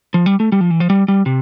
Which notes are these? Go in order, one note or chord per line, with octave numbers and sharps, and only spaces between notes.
F3
G3
A3
G3
F3
E3
F3
G3
G3
C3